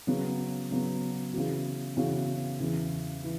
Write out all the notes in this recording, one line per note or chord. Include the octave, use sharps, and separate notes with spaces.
C#3 F#3 B3
C#3 F#3 B3
C#3 E3 B3 F#4
C#3 E3 B3 F#4
E2 C#3 E3
E3